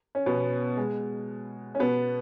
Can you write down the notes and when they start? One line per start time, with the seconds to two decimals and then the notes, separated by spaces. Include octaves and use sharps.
0.15 C#4
0.26 B2 B3
0.77 G#3
1.75 C#4
1.80 B2 B3